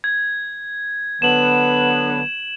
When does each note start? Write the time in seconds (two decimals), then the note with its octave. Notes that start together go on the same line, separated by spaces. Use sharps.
0.04 G#6
1.22 D3 F#3 B3 E7 F#7